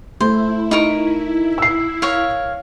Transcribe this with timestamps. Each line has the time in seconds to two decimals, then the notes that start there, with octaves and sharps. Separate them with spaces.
0.20 A3 E4 C5
0.71 D#4 A#4 C#6
1.58 E6 C7
2.02 A#4 C#5 F5